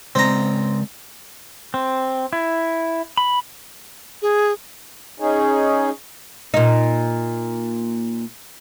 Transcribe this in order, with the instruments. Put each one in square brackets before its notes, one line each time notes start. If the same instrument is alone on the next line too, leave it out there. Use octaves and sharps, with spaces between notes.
[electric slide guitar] C#3 G#3 D5 [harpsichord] C4 A#5
[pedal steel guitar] C4
E4
B5
[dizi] G#4
[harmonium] C#4 D#4 G#4
[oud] A#2 D#4